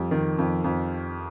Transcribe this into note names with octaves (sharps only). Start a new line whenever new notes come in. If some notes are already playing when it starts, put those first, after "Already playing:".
Already playing: F2 G3
D#3
F2
F2